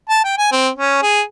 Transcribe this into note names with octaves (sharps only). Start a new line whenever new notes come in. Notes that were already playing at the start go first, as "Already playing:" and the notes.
A5
G5
G#5
C4
C#4
G#4